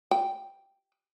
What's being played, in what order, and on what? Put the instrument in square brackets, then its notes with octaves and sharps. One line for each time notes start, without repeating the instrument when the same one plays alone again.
[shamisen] G5